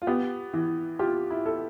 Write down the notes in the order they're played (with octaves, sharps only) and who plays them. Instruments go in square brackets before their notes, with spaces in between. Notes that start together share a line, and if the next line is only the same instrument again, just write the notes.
[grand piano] F4
[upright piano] B3 [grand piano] G4
[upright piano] E3
[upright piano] F4 [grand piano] G4
[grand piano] E4
[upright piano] A4